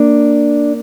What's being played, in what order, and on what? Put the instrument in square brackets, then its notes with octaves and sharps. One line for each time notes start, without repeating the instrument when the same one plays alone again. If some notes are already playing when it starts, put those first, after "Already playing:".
Already playing: [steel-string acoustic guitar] A#3 D4